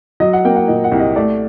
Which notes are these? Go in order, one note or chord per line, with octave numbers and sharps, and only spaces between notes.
F#3 D#5
F#5
A#3 G5
F#5
A#2 D#5
F#5
C2
D#5
A3 D5